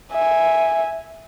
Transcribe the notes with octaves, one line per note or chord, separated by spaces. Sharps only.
E5 G#5